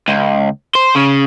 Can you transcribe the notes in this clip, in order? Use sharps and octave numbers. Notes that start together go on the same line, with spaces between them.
C#2
C5
C#3